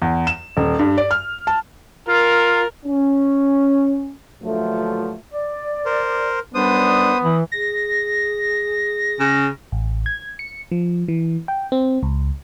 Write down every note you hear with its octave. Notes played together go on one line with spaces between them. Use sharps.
E2
E7
D#1
G2
D5
F6
A5
F4 A#4
C#4
G2 A#2 D3 F3 F#3 A3
D5
A#4 C5
F#2 G3 B3 D4 C5 D#6
E3 B5 D#6
G#4 A#6
C#3
A1
G#6
C#7
F3
E3
G5
C4
C#2